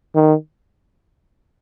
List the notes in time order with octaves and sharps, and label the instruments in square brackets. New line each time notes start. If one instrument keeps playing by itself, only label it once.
[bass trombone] D#3